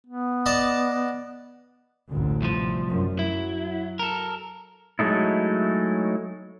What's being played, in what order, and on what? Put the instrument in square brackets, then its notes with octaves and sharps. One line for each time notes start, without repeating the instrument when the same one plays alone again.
[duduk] B3
[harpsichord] D5 D#5 A5
[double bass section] A1 D2 D3
[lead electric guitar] C2 F3
[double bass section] F#2
[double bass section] F#3 [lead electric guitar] E4
[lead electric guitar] A4 A#4
[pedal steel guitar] F#3 G#3 A3 D#4 E4